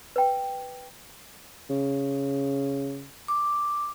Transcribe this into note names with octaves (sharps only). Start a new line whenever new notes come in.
B4 G5
C#3
D6